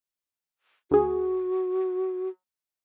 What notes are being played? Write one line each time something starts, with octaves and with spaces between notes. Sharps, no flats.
D2 F#4 G#4